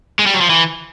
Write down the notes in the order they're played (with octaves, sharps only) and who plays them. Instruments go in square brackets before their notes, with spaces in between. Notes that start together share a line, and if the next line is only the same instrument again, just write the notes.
[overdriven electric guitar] G#3
G3
F#3
F3
E3